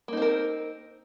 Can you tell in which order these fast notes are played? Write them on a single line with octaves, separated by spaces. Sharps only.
A#3 D#4 C4 A#4